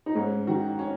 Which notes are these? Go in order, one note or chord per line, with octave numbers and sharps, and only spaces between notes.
D#4
G#2 C#4
D#3 F#4
C#4